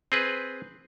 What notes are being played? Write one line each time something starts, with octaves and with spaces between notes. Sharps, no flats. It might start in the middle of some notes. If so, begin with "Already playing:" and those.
C4 G#4 B4